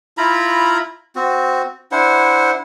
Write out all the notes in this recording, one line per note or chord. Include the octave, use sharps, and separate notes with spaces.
E4 F4 A#5 B5
C4 F#4
D4 E4 C5 F#5